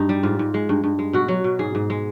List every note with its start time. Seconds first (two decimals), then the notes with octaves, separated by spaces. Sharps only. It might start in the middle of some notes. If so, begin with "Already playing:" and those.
Already playing: G2 D#4
0.09 G3
0.23 G#2 F4
0.39 G#2
0.54 G#3
0.69 G2
0.84 G2
0.99 G#3
1.13 B2 F#4
1.28 F#3
1.44 B2
1.59 G#2 G#4
1.75 G#2
1.90 G#3